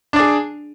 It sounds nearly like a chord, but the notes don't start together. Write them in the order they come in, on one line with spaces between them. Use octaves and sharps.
D4 D5 G#4